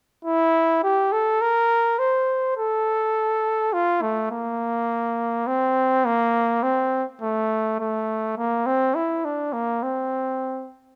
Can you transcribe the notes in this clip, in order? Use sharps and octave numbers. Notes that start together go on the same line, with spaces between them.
E4
G4
A4
A#4
C5
A4
F4
A3
A#3
C4
A#3
C4
A3
A3
A#3
C4
E4
D4
A#3
C4